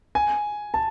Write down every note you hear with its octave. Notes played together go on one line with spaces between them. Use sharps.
G#5
A5